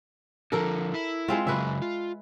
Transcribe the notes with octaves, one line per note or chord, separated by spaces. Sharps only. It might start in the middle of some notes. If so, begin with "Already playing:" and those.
D3 F3 A4 A#4
E4
G#3 C4 F4
C#3 F#3 B4 E5
F4